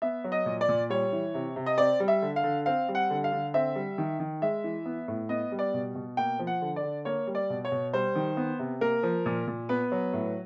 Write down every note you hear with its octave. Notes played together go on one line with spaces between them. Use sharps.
B3 E5
F#3
D#5
A#2
D5
A#2
G3 C#5
E3
C3
C3
D#5
C4 D5
G3
E5
D3
F5
D3
C4 F5
G3
F#5
D3
F5
D3
C4 E5
G3
D#3
D#3
G#3 E5
E3
B3
A2
B3 D#5
G3
D5
B2
B2
A#3 G5
F3
F#5
D3
D5
D3
A#3 C#5
G3
D5
B2
C#5
B2
G3 C5
D#3
B3
C3
A#3 A#4
F3
A#2
A#2
B3 B4
F#3
A2